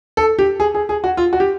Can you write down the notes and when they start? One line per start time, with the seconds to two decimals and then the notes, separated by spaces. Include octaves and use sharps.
0.17 A4
0.39 G4
0.60 G#4
0.75 G#4
0.89 G#4
1.04 F#4
1.17 F4
1.33 F#4
1.40 G4